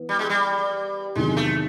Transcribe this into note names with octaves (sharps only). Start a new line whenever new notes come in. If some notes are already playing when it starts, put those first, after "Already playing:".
Already playing: E3 B3
G3
G#3
G3
E2 C3 D#3 F#3 G#3
A3